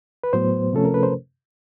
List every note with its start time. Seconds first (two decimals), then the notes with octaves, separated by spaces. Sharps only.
0.24 B4
0.33 A2 F#3 B3 C5
0.73 C3 F3 A3 C#4 A4
0.85 A#4
0.94 B4
1.03 C5